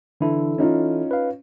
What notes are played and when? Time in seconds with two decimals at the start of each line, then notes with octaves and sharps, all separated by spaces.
0.21 D3 E3 E4 A4
0.58 C#4 D#4 F4
1.11 B4 F5